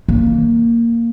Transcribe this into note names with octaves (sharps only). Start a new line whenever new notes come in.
A#3